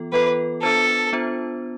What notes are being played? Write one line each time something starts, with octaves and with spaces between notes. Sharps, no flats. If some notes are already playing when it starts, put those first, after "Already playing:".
Already playing: E3 B3 F4 A4
E3 B3 F4 A4 B4
B3 D4 F4 A4 C5
B3 D4 F4 C5